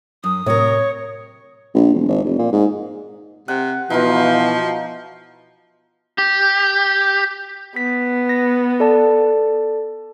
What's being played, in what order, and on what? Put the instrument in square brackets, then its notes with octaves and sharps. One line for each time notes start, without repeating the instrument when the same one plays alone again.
[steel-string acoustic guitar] F#2 [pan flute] D#6
[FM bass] A2 [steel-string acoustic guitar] C3 A#4 [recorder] C#5
[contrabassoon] A#1
E1
G#1
F1
A#2
G#2
[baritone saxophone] C3 [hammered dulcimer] F#5
[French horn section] B2 [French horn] E3 [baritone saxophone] F3 [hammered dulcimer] D#4 F4
[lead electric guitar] G4
[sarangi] B3 [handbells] B6
[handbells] A#6
A4 D5 A5